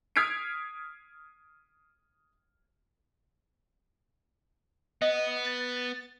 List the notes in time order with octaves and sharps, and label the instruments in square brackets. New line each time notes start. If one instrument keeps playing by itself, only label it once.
[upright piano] D#6 F6 G#6 B6 C7 D7
[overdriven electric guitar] B3 [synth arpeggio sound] D#5
[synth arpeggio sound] A6